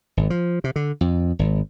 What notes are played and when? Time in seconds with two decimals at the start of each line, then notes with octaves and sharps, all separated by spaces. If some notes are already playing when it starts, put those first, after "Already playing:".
0.17 G#1
0.30 F3
0.64 C3
0.76 D3
1.01 F2
1.39 G#1